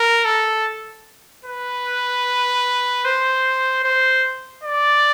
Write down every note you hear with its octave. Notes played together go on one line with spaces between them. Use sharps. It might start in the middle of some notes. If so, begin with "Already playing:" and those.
Already playing: A#4
A4
B4
C5
C5
D5